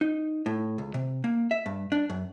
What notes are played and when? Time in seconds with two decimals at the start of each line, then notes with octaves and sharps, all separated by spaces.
0.01 D#4
0.46 A2
0.78 C#2
0.94 C3
1.24 A#3
1.51 E5
1.66 G2
1.92 D4
2.10 F#2